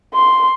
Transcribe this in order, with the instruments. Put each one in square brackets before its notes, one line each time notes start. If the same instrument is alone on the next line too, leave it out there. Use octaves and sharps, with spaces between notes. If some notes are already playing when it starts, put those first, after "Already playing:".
[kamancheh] C6